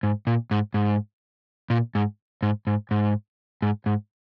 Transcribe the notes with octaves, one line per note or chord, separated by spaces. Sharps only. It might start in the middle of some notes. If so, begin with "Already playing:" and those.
G#2
A#2
G#2
G#2
A#2
G#2
G#2
G#2
G#2
G#2
G#2